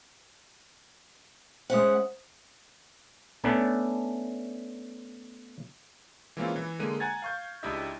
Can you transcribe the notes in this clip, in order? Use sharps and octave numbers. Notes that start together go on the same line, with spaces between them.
G#3 C#4 C5 E5 F#5 D#6
A3 B3 C#4 D4
E3 G#3 A#3 C4 C#4 F4
E3
D3 G#3 A#3 D#7
F#5 G#5 A#5 G#6 A6
F5 C#6 G6
C#2 D4 E4 G4 D#5 E5